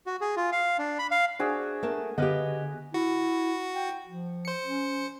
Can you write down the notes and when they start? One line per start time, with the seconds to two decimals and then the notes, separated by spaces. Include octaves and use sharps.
0.06 F#4
0.21 G#4
0.36 F4
0.52 F5
0.79 D4
0.99 B5
1.11 F5
1.39 D4 F#4 G#4 C5 E5
1.83 A3 A#4 A5
2.18 D3 B3 G4 B4 D#5 F5
2.94 E4 F#4
3.75 G5
4.06 F3
4.45 C5 C#7
4.65 C#4